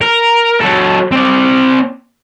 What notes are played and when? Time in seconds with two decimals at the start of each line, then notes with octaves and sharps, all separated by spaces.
0.01 A#4
0.60 F#3 A4
1.11 C4 D5